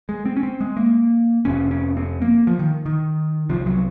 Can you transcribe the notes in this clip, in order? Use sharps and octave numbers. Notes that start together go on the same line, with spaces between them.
G#3
C4
C#4
C4
G#3
A#3
F1 F2 C3 C#4
C#4
C4
A#3
F3
D#3
D#3
C2 C3 F3
F#3